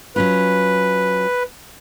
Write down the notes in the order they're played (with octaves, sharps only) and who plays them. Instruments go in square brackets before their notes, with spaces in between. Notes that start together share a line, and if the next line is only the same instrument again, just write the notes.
[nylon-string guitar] F#3 C#4 F4 [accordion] B4